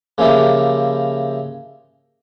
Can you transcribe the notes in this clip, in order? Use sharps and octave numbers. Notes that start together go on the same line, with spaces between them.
C#3 F3 A#3 E4 G4